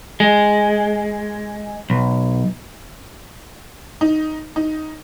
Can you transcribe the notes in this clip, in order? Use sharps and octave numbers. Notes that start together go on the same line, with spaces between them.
G#3
B1
D#4
D#4